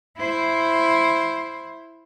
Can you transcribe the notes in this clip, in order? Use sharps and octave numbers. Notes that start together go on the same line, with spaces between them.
E4 C5